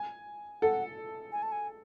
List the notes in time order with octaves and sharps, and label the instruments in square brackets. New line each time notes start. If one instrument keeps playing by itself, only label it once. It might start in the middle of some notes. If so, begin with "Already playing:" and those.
Already playing: [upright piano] G#5
[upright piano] A4 [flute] F#5
[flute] G#5
A5
G#5